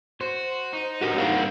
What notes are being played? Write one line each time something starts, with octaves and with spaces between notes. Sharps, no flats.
F#4 C5
D#4
F#4 G4 A#4
G2 A#2 D#3 F3 C4 A#4 F5 F#5